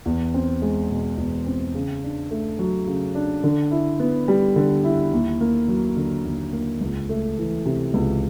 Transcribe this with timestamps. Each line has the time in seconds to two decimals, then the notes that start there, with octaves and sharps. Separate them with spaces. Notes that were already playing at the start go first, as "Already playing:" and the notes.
0.06 E2
0.34 C4
0.62 G#3
0.90 B2
1.18 E2
1.46 C4
1.75 C#3
2.03 D4
2.31 A3
2.59 F#3
2.87 C#3
3.15 D4
3.44 D3
3.71 E4
4.00 B3
4.28 G3
4.56 D3
4.84 E4
5.12 D#2
5.41 A#3
5.68 F#3
5.97 D3
6.25 D#2
6.53 A#3
6.81 C#2
7.09 A3
7.38 E3
7.65 C3
7.94 C#2